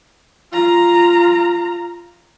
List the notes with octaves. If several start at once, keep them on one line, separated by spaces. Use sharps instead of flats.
F4 A#5